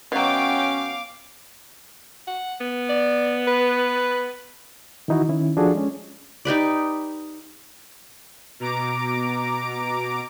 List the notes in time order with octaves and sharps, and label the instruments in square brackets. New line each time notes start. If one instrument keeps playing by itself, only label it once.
[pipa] B2 F#3 [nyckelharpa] B3 G5 [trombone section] C#4 [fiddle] F5 D6
[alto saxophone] F#5
B3
[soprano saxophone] D5
B4
[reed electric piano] D#3 E3 D#4 E4 F#4
D#3 C#4 E4
F3 D4 F4 F#4 G#4 A4
G#3 C#4
[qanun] D#4 G4 B4 D5
[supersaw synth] B2 A#5 D6 D7